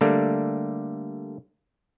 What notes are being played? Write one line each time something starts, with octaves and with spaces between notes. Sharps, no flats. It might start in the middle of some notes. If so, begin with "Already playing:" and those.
D3 G3 A3 A#3 D4